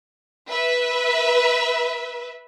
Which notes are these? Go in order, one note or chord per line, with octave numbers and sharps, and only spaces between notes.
B4 E5